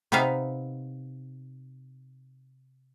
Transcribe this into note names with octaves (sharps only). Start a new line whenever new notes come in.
C3 B3 D#4 E5 F5